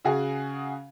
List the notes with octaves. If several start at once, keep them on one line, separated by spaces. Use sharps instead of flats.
C#3 F#4 G#4